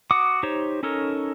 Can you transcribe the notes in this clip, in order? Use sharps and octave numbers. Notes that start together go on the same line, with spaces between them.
F#4 F#5 D6 D#6
D#4 G4 C5 C#5
C#4 D#4 A4 A#4 C#5